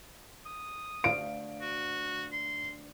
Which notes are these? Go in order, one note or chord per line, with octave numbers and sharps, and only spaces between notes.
D#6
D2 F5 D7
F#4
C6